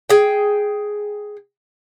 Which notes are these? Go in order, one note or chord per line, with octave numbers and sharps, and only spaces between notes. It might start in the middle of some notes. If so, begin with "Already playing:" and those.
G#4 G5